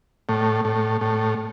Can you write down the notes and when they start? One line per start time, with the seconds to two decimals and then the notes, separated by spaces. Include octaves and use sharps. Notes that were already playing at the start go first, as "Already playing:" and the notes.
0.29 A2
0.65 A2
1.01 A2